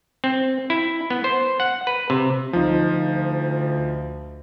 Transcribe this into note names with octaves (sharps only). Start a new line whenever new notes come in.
C4
E4
B3
C5
F#5
B4
C3
D2 F3 D#4